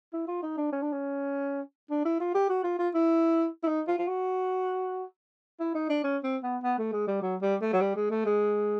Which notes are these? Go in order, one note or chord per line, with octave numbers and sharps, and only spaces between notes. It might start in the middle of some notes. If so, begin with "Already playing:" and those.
E4
F4
D#4
D4
C#4
D4
C#4
D4
E4
F4
G4
F#4
F4
F4
E4
E4
D#4
F4
F4
F#4
E4
D#4
D4
C#4
C4
B3
B3
A3
G#3
G3
F#3
G3
A3
F#3
G3
G#3
A3
G#3